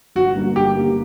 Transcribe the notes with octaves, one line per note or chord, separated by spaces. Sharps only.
G1 F#4
G2 D3 G3 A#3
G1 G4
D3 G3 A#3